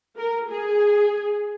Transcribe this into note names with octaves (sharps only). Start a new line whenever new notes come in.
A#4
G#4